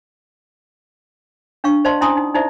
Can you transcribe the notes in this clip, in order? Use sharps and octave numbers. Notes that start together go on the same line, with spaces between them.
D4 F5 C#6
C5 D5 D#5 F5 A5 C6
C#4 E4 G#5 A#5 C6 D#6
D#4
D#4 E4 C5 D5 E5